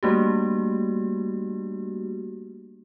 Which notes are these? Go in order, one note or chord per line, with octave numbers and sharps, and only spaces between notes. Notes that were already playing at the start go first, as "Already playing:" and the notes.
G3 A3 A#3 D4 F#4 G4